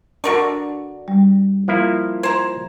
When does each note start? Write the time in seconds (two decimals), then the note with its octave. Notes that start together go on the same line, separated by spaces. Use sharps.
0.24 D3 D4 F#4 A#4 C#6
1.08 G3
1.68 F3 A#3 E4
2.23 C5 A#5 G#6